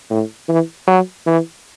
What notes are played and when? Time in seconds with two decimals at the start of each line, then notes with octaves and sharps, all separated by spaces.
0.10 A2
0.49 E3
0.87 F#3
1.27 E3